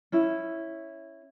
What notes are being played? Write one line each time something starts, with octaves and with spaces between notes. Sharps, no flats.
C#4 E4